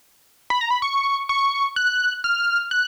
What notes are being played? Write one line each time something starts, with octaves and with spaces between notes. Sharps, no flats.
B5
A#5
B5
C#6
C#6
F#6
F6
F#6